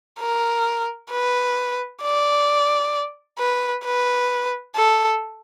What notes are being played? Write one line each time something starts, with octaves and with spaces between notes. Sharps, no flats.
A#4
B4
D5
B4
B4
A4